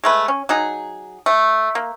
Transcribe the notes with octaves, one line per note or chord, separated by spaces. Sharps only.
G#3 A3 B4
C#4
F#3 D#4 G#4
A3
A#3